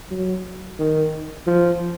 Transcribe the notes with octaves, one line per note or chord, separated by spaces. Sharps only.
F#3
D#3
F3